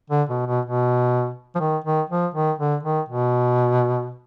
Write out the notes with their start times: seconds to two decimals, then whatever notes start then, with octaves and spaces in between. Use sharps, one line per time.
0.10 D3
0.29 B2
0.47 B2
0.65 B2
1.55 F3
1.60 D#3
1.85 D#3
2.09 F3
2.34 D#3
2.58 D3
2.83 D#3
3.09 B2